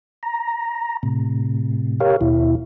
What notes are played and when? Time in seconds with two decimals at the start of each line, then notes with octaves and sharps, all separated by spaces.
0.23 A#5
1.03 A2 C3
2.00 G4 A#4 C#5 F5
2.21 D#2 B2 E4